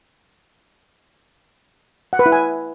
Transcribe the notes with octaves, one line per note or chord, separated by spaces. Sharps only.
F#5
B4
E4
G#5